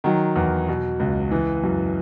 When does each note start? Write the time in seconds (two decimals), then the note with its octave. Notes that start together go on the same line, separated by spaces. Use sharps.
0.04 D#3 F#3
0.36 E2
0.69 B2
1.00 C#2
1.31 E3
1.63 F#2